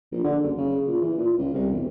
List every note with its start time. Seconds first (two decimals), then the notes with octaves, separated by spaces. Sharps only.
0.12 A#1
0.24 D3
0.43 F#1
0.58 C#3
0.87 A#2
1.01 E3
1.18 A#2
1.38 C#2
1.54 C2
1.72 E1